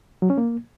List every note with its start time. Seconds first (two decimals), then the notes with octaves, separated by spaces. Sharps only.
0.22 F#3
0.30 C#4
0.38 A#3